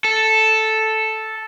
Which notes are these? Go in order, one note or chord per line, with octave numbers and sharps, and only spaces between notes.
A4